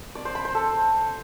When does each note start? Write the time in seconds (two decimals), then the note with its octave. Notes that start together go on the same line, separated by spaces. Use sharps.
0.15 D5
0.25 C5
0.35 B5
0.45 C5
0.55 A4